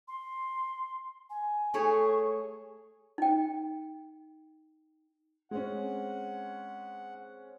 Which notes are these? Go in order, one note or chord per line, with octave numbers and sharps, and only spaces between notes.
C6
G#5
A3 G#4 C#5 C#6
D#4 G5
G#3 C4 C#4 F#5